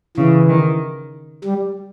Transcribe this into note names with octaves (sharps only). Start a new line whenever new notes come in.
C#3 E3
D#3
G3